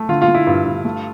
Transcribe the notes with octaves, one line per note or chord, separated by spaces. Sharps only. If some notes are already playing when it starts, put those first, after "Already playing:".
Already playing: A3
D3 F4
F4
A3
E4
G2 F4
G2
A3